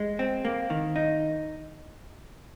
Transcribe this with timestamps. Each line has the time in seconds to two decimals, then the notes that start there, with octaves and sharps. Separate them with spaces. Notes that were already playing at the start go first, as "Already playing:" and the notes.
Already playing: G#3
0.19 C4
0.45 A#3
0.70 D#3
0.96 D#4